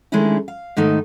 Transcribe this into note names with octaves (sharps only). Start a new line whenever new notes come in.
D#3 G#3 A3 C#4 D4 E4
F5
G#2 D#3 A3 D#4